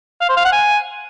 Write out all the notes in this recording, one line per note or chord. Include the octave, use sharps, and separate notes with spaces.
F5
C5
F5
F#5
G#5